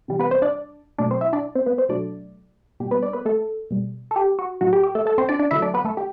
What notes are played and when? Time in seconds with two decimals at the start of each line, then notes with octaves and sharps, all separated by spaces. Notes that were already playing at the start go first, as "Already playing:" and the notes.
0.08 C3 E3 G3
0.19 B3 B4
0.31 C4 C5
0.42 D4 D5
0.98 B2 F#3 A3 D4 D5
1.11 C4 C5
1.21 E4 E5
1.33 D4 D5
1.55 C4 C5
1.66 B3 B4
1.78 C4 C5
1.89 B2 F#3 A3 D4 D5
2.80 B2 G3 G4
2.91 B3 B4
3.02 D4 D5
3.13 B3 B4
3.25 A3 A4
3.71 B2 G3
4.11 A4
4.16 G4
4.39 F#4
4.61 A2 F#3 A3 F#4
4.73 G4
4.83 G4
4.95 A3 A4
5.06 A3 A4
5.18 C4 C5
5.29 D4 D5
5.39 D4 D5
5.51 D3 F#3 A3 E4 E5
5.62 D4 D5
5.74 B3 B4
5.85 A3 A4
5.97 G4